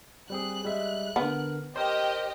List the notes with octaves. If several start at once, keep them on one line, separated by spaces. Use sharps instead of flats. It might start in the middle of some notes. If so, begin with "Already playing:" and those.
G3 C4 G#4 F#6
G3 G#3 E5
D3 B3 A#4
G4 A#4 C5 D#5 G5